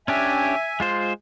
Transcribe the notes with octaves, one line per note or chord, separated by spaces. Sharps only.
C#4 D4 G4 E5 G#5
G#3 F4 C5